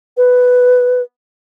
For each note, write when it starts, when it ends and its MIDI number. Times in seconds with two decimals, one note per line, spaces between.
0.17 1.02 71